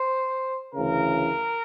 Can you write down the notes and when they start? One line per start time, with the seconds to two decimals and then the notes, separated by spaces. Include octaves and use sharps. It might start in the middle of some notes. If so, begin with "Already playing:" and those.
Already playing: C5
0.74 D2 C#3 E3 A#4